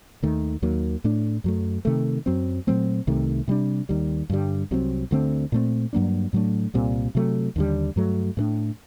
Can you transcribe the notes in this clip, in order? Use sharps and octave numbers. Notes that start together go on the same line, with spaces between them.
D#2 D#3 A3
D#2 D#3 F#3 A#3
A2 A3 D4
F#2 F#3 A3
C3 D#3 A3
F#2 F#3 C4
A#2 F#3 A3 C4
C2 C3 D#3 A3
C3 G3 D4
D#2 D#3 G3
G2 D3 G3
C2 C3 F#3 C4
D2 D3 A3 C4
A#2 A3 C4
G2 F#3 A#3 D4
A2 F#3 A3 D4
C2 A#2 G3 C4
C3 F#3 A3
D#2 D3 G3
G2 F#3 A3
A2 A3 D4